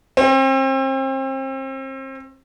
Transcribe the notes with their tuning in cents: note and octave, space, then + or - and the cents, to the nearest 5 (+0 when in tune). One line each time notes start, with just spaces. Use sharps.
C4 +35